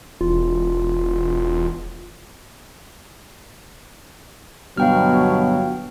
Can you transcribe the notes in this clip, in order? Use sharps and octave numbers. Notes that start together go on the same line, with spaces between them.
E1 F4
G1 B2 F#3 F5 G5 F6